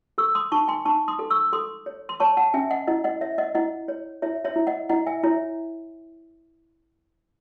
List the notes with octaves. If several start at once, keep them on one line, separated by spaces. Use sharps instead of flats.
A4 C#6 E6
C6 D#6
D#4 A5 C#6
G#5 C6
D#4 A5 C#6
C6 D#6
A4
C#6 E6
A4 C6 D#6
C#5
C6
C#5 A5 C#6
F#5 A5
C#4 E5 G#5
D#5 F#5
E4 D#5 F#5
D#5 F#5
C#5 E5
D#5 F#5
E4 D#5 F#5
C#5
E4 C#5 E5
C#5 E5
E4
D#5 F#5
E4 D#5 F#5
E5 G#5
E4 C#5 E5